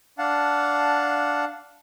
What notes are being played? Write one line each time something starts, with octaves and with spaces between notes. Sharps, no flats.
D4 F5 F#5 A5